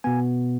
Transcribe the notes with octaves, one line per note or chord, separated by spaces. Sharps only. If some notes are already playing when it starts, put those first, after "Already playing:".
B2 B3 G#5